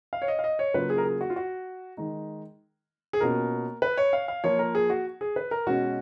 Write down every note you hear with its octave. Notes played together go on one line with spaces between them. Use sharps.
F5
C#5
D#5
F5
D#5
C#5
C#3 F#3 A#3 F4 B4
G#4
A#4
G#4
F#4
F4
F#4
D#3 G#3 D#4
G#4
B2 A#3 C#4 F4 A#4
B4
C#5
F5
F5
F3 A#3 F4 C#5
A#4
G#4
F#4
G#4
B4
A#4
B2 G#3 C#4 F#4